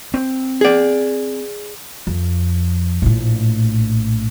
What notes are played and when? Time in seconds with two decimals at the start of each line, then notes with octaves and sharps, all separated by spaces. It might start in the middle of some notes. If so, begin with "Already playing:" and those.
0.14 C4
0.61 G#4 D5
2.07 F2
3.02 A#1 A2